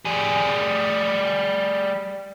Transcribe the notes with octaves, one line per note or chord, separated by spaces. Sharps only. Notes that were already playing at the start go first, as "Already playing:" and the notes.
G3 G#4